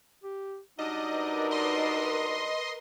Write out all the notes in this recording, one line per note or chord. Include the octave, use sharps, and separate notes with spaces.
G4
F#3 G3 D4 D#4 D#5
A#4 B4
D#5 C6